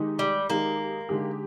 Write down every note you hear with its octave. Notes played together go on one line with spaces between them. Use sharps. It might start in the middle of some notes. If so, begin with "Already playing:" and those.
Already playing: D#3 G#3 D#4 G4
G3
D#3 G#3 A#3 D#4 G4
D3 G#3 D#4 G4